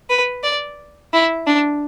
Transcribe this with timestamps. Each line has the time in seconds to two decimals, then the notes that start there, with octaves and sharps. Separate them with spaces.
0.10 B4
0.44 D5
1.13 E4
1.47 D4